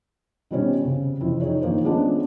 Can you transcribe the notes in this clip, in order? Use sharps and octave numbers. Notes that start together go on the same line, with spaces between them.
B2 D#3 G3 C4 C#4 D#4
C#3
F2 C3 E3 E4
D#4 G#4 C#5
D#3 F3 A#3 D#4 C5
G#3 B3 C#4 D4 F4